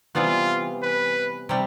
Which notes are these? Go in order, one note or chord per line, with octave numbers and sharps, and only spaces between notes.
C3 E3 G3 B3 F4
B4
C3 G3